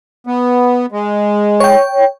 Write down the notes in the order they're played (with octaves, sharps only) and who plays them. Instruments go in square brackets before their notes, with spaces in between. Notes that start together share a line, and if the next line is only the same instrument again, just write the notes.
[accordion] B3
G#3
[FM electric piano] C#5 G5